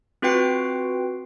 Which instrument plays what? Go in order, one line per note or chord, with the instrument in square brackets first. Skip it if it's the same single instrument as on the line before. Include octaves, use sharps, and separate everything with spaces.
[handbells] C4 F4 F#4 B4 G5 C7